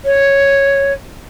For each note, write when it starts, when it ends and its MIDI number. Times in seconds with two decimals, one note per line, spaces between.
0.05 0.93 73